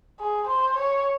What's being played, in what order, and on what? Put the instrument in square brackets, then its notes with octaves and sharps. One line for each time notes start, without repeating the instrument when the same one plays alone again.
[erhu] G#4
C5
C#5